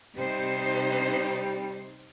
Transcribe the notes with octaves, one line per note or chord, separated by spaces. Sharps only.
C3 G3 D#4 C5